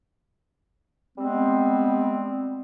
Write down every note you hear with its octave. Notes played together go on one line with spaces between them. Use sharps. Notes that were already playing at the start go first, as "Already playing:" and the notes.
G3 G#3 B3 C4